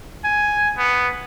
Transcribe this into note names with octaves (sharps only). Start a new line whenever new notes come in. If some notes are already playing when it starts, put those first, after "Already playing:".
G#5
B3